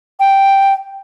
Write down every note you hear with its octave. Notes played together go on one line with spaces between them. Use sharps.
G5